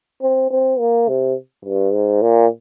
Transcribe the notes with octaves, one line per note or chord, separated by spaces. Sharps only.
C4
C4
A#3
C3
G2
G#2
A#2